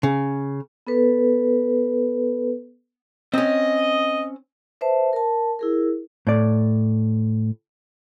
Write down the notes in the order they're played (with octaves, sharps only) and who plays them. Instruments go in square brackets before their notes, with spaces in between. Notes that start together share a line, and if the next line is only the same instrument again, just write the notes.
[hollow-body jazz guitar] C#3
[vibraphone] B3 A4 B4
[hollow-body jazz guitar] C4 C#4 [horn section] D#5
[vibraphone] B4 C5 E5 A5
A#4 A5
E4 G#4 A#4
[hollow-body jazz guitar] A2 D5